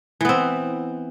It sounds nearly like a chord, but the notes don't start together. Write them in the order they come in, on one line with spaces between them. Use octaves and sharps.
E3 B3 C4